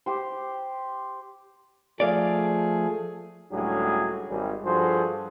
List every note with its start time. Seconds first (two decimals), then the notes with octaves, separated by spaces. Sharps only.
0.06 G4 C5
2.00 F3 A3 G#4 D5 F5
3.51 C#2 A2 F#3 G3 D4 G#4
4.28 G#1 G3 G#4
4.64 G2 F3 F#4 G#4 A4 C5